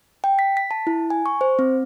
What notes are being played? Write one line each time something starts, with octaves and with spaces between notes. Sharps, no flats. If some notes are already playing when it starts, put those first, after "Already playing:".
G5
B6
B6
A5
E4
G#5
C#6
C5
C4